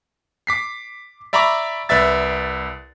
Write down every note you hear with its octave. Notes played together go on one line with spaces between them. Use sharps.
D6 B6 C7
D5 E5 A#5 B5 C#6 D6
C2 B4 D5 E5 A6